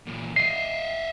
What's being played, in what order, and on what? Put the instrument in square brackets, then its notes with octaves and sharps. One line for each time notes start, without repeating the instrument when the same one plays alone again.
[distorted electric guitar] A#2 E3
[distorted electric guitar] D#5 E5 [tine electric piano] C7